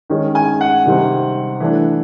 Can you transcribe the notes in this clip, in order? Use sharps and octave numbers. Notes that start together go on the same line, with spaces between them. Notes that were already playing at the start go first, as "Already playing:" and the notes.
D#3 G#3 C#4
G#5
F#5
C3 D#3 G3 C4
E3 A3 D4